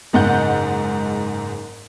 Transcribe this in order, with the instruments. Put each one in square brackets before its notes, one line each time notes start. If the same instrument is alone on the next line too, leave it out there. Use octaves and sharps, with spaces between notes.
[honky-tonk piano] F#1 G#2 F#5 G6